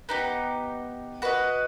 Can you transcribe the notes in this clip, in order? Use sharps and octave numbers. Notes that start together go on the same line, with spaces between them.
B3 D#4 G4
F#4 B4 D#5